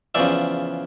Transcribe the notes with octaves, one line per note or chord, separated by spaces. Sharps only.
E2 C#3 F3 D5 E5